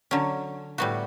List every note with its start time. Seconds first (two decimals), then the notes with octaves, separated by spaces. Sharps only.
0.11 D3 F#3 C#4
0.78 A2 G3 B3 F#4